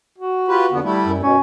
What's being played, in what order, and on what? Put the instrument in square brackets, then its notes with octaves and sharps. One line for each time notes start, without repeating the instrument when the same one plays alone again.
[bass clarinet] F#4
[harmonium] F4 G4 B4
F2 D3 B3
G3 A3 E4
[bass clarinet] F#2
[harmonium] B2 [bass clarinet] C#4